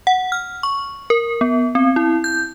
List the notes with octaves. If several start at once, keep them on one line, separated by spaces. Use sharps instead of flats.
F#5
F6
C#6
A#4
B3
C4
E4
G6